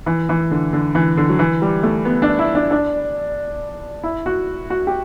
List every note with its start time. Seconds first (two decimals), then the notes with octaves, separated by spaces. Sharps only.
0.06 E3
0.29 E3
0.51 D3
0.73 D3
0.95 E3
1.17 D3
1.29 F#3
1.39 E3
1.62 G3
1.83 A3
2.05 B3
2.22 D4
2.39 E4
2.55 D4
2.71 D4
4.03 E4
4.26 F#4
4.70 F#4
4.87 G4